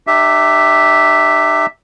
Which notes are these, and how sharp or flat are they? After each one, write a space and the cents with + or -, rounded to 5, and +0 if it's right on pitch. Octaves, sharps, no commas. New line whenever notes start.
D#4 -45 G4 +0 E5 +0